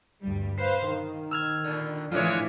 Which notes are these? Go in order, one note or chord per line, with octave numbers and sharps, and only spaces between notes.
D2 G2 G3
B4 C5 F5 C7
D#3
E6 F6 G#6
A#2 D3
A2 D3 E3 F3 G#3 F4 C#5 D6